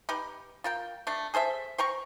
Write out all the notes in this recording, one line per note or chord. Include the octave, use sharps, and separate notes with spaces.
D#4 G4 B4
F4 A#4 G5
A3 D4
G#4 A4 C5 E5
C5 G5 A#5 C#6